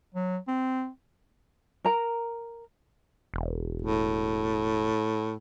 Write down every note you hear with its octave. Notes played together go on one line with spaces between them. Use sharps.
F#3
C4
A#4 A#5
E1
A2